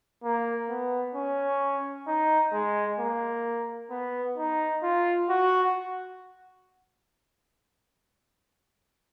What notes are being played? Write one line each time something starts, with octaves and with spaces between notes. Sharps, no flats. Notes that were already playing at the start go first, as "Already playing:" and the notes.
A#3
B3
C#4
D#4
G#3
A#3
B3
D#4
F4
F#4